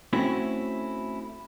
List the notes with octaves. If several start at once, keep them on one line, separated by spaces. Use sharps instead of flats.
A3 C4 C#4 E4 F#4